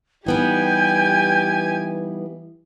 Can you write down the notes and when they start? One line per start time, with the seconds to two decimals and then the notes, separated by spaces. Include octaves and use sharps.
0.26 E3 G3 B3 D#4 G4 G5 G#5